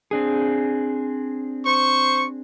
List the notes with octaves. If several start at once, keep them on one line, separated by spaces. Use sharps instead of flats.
C4 D4 G#4
C5 C#6